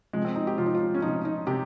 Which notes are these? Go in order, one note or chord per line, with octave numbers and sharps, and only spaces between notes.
C3 F3 G#3
C4
D#4
G4
C3 F3 F4
D#4
F4
C#4
C3 F3 D#4
D#4
C3 G4